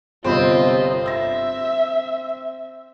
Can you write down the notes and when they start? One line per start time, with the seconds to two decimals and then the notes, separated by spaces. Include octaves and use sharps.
0.24 G1 C3 C4 F4 D#5 B5
1.06 E5 E6 A#6